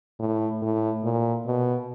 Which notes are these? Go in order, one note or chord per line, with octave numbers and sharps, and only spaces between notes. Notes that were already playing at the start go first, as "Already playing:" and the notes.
A2
A2
A#2
B2